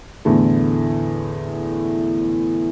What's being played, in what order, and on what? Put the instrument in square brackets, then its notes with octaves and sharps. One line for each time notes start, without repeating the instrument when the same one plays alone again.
[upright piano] E2 A2 D3 A3 E4